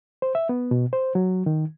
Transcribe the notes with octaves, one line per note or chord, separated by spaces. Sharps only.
C5
E5
B3
B2
C5
F#3
D#3